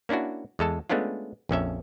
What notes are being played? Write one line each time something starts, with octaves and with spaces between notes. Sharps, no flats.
A#3 C#4 D4 E4 F#4
E2 G#3 A4 A5
G#3 A3 B3 C#4 D4 F4
A#1 F2 C#4 E5